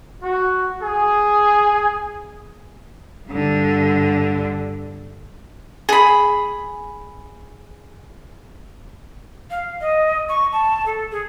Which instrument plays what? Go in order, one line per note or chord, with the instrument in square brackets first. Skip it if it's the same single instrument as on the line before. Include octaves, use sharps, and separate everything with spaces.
[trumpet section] F#4
G#4
[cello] G2 D3
[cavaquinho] G#4 B5
[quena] F5
D#5
C#6
A5
A4
G#4